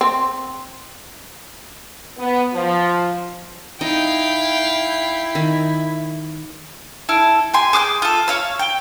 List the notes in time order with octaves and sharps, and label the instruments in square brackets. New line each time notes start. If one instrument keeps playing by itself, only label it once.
[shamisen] C4
[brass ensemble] B3
F3
[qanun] D#4 [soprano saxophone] E4 [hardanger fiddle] F5 G5
[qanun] D#3
[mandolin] E4 A4 F6
G4 G#5 C6
G#4 D6 F6 G6
F4 A4
C#5 F5 E6
G5